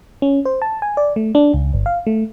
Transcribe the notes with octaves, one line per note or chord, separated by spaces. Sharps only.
C#4
C5
A5
G#5
D5
A3
D4
C#2
G1
F5
A3